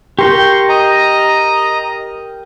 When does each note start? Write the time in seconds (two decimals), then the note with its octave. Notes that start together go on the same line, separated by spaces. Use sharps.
0.19 G4 A#4 G5 C6 C#6
0.69 D#5 A#5